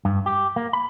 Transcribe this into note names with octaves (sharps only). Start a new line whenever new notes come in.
G2
G4
A#3
B5